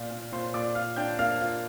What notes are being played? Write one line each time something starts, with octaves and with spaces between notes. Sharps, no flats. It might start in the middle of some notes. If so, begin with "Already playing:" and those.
Already playing: A#2 F4 D5
A#2
A#2 C5 C6
A#2 D5 D6
F4 F5 F6
D4 G5 G6
A#3 F5 F6
F4